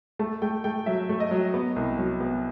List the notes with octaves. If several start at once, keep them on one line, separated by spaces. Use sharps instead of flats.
A3 A5
A3 G5
A3 G5
F#3 E5
A3
D#5
F#3
B3
C2
F#3
B3